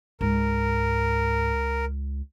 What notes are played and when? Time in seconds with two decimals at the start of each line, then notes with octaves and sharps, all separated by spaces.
0.21 C#2 G#2 A#4